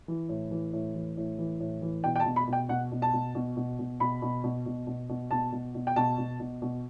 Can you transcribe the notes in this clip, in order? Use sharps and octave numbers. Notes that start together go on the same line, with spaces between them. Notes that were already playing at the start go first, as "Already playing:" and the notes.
E3
A2
E3
A2
E3
A2
E3
A2
E3
B2 G5
G5
A5
B2
B5
B2
G5
B2 F#5
B2
A5
B2
B2
B2
B2
B2 B5
B2
B2
B2
B2
B2
B2 A5
B2
B2
G5
B2 A5
B2
B2
B2